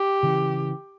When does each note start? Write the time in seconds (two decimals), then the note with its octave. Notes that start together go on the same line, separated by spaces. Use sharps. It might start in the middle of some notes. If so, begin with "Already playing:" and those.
Already playing: G4
0.23 C#3 E3